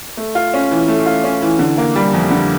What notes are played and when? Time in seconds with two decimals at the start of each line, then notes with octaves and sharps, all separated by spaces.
0.17 A3
0.35 F4
0.54 C#4
0.71 E3
0.88 A3
1.06 F4
1.24 C#4
1.42 E3
1.59 D3
1.78 A#3
1.96 G3
2.13 F2
2.30 D3